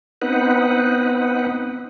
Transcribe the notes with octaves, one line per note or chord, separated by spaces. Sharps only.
B3 C4 D#4 B4 F#5